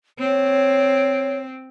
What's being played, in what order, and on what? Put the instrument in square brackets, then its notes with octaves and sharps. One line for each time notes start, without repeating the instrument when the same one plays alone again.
[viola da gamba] C4 [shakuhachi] C#5